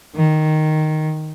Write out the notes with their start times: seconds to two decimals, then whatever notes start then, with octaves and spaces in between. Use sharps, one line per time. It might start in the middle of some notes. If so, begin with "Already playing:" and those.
0.15 D#3